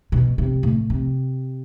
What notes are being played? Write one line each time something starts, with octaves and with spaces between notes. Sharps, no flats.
B2
C3
A2
C3